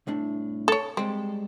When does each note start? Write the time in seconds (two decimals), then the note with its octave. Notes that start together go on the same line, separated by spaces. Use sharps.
0.07 C2 A2 D4
0.68 A4 C#5
0.97 G3 G#3 C4